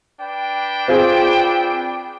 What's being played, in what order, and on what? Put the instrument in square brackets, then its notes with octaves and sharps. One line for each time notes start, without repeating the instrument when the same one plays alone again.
[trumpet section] D4 B4 G5
[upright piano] C4 F4 G#4